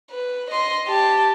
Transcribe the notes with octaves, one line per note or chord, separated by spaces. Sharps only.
B4
D#5 C6
G4 A5